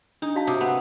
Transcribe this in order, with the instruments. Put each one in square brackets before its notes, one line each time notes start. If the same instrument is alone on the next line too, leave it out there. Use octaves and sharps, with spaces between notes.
[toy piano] D4 [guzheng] D#4
[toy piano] F#4 F5 A5
[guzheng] C3 [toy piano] A5 D6 D#6
[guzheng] B3